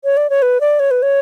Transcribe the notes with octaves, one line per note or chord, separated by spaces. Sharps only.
C#5
D5
C#5
B4
D5
C#5
B4
C#5